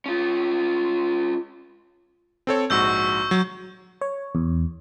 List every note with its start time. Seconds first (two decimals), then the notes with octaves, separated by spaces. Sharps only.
0.06 C#4 F4
2.47 C4 A4 C#5
2.70 A#1 G#2 F#4 C#6 E6 G6
3.31 F#3
4.01 C#5
4.35 E2